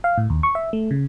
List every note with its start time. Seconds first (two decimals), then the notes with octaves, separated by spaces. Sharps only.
0.04 F5
0.18 A2
0.30 D#2
0.43 C#6
0.55 E5
0.73 A3
0.91 C#3